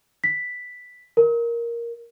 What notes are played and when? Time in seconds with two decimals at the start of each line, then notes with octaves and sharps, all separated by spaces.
0.24 B6
1.17 A#4